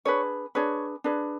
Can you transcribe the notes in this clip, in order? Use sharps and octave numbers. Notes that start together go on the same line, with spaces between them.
D4 G#4 B4 C#5
D4 G#4 B4 C#5
D4 G#4 B4